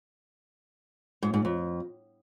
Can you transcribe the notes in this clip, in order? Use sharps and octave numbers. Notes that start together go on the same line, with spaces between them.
G#2
G#2
F2